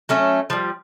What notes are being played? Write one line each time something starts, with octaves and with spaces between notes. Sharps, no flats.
F#3 A3 C#4
F3 G3